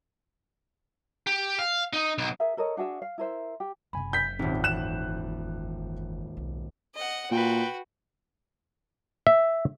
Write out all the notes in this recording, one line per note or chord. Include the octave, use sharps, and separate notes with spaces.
G4
F5
D#4
B1
G#4 A#4 E5
A4 A#4 C#5 D#5
D4 F#4 G#4 E5
F5
E4 A#4 C5 E5
G4
F#1 C3 G#3 G#5 B5
G6 B6
D#1 G#1 C4 D#4 G4
E3 F#6 E7
B1
D#5 F#5
A#2 F#4 B4 G5
E5